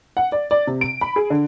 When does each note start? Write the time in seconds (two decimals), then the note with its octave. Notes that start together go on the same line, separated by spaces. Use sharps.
0.17 F#5
0.32 D5
0.51 D5
0.67 C3
0.81 D7
1.01 B5
1.16 G#4
1.30 D3